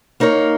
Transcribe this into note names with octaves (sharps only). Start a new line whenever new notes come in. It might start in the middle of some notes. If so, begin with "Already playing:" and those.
A#3 D#4 A#4 C#5